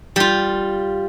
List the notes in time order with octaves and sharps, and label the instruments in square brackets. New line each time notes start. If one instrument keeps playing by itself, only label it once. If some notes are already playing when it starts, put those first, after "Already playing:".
[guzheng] G3 F4